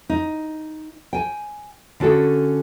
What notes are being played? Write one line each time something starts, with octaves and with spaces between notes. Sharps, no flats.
D#4
G5 G#5
D3 C#4 F#4 A4 G5